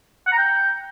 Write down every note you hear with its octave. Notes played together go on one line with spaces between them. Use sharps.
F#5
A#5
G5